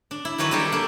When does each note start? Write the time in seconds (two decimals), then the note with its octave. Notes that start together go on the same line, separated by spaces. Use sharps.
0.11 D4
0.25 E4
0.38 D#3 E3 F#3 B4 C#5
0.51 G3 A#3 D4 G4 A4
0.72 A#3 D4